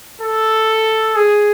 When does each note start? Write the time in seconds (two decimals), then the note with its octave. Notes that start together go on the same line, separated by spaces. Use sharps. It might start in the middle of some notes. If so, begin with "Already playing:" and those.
0.22 A4
1.16 G#4